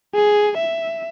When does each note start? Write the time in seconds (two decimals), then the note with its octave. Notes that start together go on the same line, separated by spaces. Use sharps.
0.15 G#4
0.58 E5